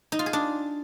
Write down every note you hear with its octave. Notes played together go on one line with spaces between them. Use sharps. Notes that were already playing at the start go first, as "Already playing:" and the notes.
D#4
F4
G#4
D4